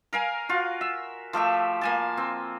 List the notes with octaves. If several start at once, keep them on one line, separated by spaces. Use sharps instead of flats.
A#4 F5 G#5
F4 F#4
E5
F3 A3 G4 E5
A#3 G#5 A5
C4